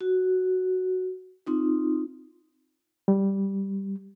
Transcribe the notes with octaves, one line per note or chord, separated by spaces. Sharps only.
F#4
C4 D#4 F4
G3